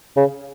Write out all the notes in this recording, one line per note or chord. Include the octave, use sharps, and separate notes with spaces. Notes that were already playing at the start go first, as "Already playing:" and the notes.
C#3